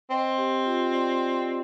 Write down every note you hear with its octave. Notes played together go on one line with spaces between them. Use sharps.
C4 D#5
G4
F4
D5